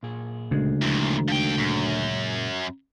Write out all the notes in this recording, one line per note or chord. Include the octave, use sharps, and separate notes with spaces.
A#2 G#4
D2 C#3 G#3
D#2 A#2 D3 F3 E4
D3 D#3 F3 G5
F#2 A#2 G#4